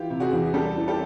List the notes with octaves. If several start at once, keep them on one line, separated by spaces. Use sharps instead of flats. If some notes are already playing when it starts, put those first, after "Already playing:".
Already playing: E3 F4 G4
C3
F#4 G#4
E2
G3 G4 A4
E3
G4 A4